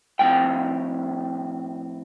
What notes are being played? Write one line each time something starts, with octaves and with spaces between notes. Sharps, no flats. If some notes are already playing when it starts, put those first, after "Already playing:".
A2 F3 C4 G5